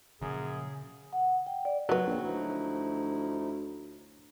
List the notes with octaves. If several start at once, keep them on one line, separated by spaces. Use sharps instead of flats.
F#2 A#2 C#3 F3 G#4
F#5
G5
D5
F#3 B4 D#5
A#1 A#2 C#3 C4
D2 F3 D#4 E4